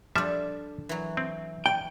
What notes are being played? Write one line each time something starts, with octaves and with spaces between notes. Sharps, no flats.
F3 G3 D4 A4 E5
E3 F#3
C4
D5 G5